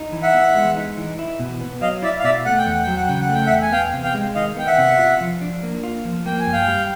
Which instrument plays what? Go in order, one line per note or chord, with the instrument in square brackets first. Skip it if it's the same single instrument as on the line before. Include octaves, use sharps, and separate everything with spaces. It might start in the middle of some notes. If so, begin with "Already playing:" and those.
Already playing: [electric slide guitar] D#4
E3
[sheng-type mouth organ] E5 F#5
[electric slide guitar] B3
G#3
D#4
E3
E4
B2
B3
[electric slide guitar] F#3 [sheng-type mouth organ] D#5 F5
[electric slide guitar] E4 [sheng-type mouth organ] D5 E5
[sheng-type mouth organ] F5
[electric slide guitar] B2 [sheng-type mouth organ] D5 E5
[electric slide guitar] A3 [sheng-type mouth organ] F#5
[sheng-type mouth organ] G5
[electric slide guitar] E2 [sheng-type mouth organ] F#5
[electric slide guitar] F#3 [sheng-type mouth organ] G5
[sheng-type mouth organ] F#5
[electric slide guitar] C#3 [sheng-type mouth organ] G5
[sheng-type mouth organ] F#5
[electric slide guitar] A3 [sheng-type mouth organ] G5
[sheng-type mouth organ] E5 F#5
[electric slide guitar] E2
[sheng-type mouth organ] G#5
[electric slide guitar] B3 [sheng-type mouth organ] F5 G5
[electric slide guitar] C3
[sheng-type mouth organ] F5 G5
[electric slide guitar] G#3
[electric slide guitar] D#3 [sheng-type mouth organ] D#5 F5
[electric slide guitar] B3 [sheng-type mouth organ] G5
[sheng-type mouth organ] E5 F#5
[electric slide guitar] C3
F4
F3
D4
A#3
F4
F3
[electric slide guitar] A#3 [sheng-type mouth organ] G5
[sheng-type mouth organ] G#5
[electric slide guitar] G2
[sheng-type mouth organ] F5 G5
[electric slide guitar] G3